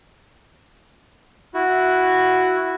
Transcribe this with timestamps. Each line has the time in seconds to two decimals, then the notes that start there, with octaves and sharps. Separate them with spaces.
1.54 E4 F#4